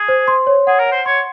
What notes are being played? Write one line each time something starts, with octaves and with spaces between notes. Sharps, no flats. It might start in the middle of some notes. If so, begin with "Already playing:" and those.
Already playing: G#4
C5
C6
C#5
G#4 F#5
A#4
F#5
C5
C#5 C6